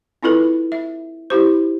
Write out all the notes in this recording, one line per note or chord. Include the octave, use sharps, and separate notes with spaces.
C4 E4 F4 A4 B4
E5
E4 G4 C5